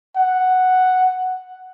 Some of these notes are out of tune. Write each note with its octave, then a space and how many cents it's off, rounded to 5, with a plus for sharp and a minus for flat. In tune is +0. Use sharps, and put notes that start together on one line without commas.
F#5 +0